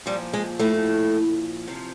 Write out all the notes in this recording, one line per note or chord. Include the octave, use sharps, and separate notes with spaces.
A#2 F3 G3
G#3
A2 A3
C3 F3